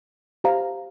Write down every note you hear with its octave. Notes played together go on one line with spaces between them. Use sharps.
G4 C5 F5 A#5